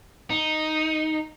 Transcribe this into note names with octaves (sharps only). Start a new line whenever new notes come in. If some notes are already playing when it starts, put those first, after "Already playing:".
D#4